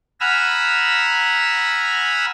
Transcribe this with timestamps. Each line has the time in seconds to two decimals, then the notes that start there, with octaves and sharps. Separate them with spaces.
0.20 F#5 G#5 A#5 B5 E6 F6